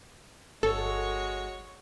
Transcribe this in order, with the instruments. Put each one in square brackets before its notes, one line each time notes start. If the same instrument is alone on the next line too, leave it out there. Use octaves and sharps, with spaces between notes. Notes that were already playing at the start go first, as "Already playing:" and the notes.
[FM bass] G1 [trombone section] G#3 F#4 [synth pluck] A4 [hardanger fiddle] C#5